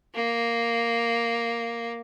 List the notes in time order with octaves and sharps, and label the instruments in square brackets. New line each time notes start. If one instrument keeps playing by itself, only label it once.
[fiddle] A#3